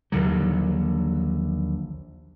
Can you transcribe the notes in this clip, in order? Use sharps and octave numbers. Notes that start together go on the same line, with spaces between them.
A#1 D#2 D3 F#3